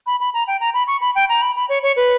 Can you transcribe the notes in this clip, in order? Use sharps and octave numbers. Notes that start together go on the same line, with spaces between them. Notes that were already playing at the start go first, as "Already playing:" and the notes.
B5
B5
A#5
G5
A#5
B5
C#6
B5
G5
A#5
B5
B5
C#5
C#5
B4